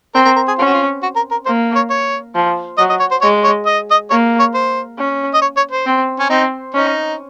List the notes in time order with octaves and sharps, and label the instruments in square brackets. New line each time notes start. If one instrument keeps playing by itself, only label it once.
[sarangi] C4 [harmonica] A#4
[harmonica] A#4
A#4
G#4
[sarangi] C#4 [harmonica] F4
[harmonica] F#4
F4
F#4
A#4
A#4
[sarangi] A#3 [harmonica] C5
[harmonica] C#5
C#5
[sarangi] F3
[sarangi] F#3 [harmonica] D#5
[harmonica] D#5
C#5
C5
[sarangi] G#3 [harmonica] C#5
[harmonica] C#5
D#5
D#5
[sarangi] A#3 [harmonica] C#5
[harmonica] C#5
C5
[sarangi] C#4
[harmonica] D#5
C#5
C#5
C5
[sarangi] C4
[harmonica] C#4
[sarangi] C4 [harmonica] D#4
[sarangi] C#4 [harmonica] D#4